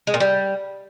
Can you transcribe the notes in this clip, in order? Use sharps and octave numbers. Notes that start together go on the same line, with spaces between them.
G#3
A#2
G3